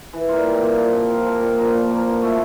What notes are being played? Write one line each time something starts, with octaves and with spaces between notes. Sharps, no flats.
E3
G3 A#3 F4
E3
G3 A#3 F4
F3
C4 F4 A#4
F3
C4 F4 A#4
A#2
F3 A#3
A#2
F3 A#3
F3
A3 E4